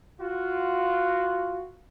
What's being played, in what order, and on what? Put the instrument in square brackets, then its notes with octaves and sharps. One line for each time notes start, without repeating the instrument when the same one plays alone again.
[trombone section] F4 F#4